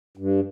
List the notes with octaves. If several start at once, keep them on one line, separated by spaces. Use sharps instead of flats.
G2